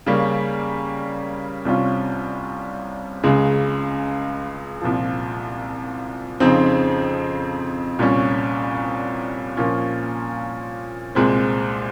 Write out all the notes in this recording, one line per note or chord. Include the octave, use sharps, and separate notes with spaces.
C#3 G3 A#3 C#4
C2 C3 G3 C#4 F4
C#2 C#3 G#3
C2 A#2 F3
F2 C#3 F3 C4 D#4
C2 A#2 G3 C#4
A#2 F3 A#3 C#4 F4
C2 A#2 G#3 C4